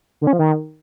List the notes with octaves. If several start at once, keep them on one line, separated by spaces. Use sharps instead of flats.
D3
C#4
F3
D#3